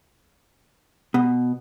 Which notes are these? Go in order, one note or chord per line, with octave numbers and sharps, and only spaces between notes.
B2